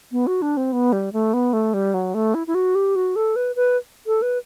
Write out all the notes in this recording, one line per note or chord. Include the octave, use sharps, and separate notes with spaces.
B3
F#4
D4
C4
B3
G3
A3
B3
A3
G3
F#3
A3
E4
E4
F#4
G4
F#4
A4
B4
B4
A4
B4